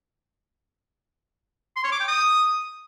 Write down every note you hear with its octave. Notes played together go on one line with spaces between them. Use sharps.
C6
C#5
D6
G5
D#6